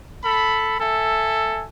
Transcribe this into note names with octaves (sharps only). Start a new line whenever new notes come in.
A4 B5
A4 E5 G#5